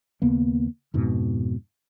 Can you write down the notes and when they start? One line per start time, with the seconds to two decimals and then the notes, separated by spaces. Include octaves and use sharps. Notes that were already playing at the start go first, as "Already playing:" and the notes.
0.22 D#2 C#3 A#3 B3
0.94 F2 G#2 B2